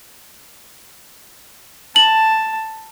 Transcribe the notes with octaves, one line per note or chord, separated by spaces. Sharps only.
A5 F#7